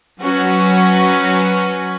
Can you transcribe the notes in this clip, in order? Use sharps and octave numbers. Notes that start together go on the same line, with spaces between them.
F#3 C#4 F#4 B4